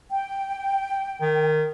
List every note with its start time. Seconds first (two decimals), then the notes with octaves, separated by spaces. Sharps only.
0.11 G5
1.21 D#3